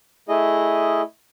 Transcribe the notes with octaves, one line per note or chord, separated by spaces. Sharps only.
A3 E4 G#4 D#5